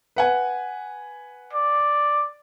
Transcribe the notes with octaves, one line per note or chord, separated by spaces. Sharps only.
B4 F#5 G#5
D5